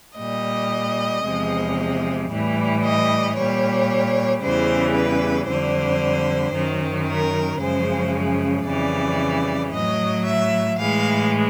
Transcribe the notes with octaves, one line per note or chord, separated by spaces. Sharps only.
A#2 G3 D#5
E2 C3 F3 G#3
A2 E3 G3
D#5
A#2 G3 C#5
E2 C#3 E3 G3 C5
B4
F2 D3 G3 C5
F#2 D#3 F#3
A#4
F#2 C#3 F3 G#3 C5
F2 C#3 E3 G3 D5
A2 F#3 D#5
E5
A2 E3 G#3 F5